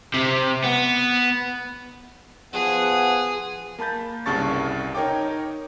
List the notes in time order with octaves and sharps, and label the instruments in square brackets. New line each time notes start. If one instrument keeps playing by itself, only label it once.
[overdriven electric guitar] C3
B3
[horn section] F3 B3 F#5 [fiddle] G#4
[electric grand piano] A#3 A5 B5 G6 A6
C2 G2 C#3 A5 C#6 A6
D#4 A#4 C#5 G5 D6